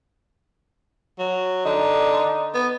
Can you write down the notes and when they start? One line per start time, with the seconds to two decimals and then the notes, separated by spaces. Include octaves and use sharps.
1.19 F#3
1.66 D3 D#4
2.54 B3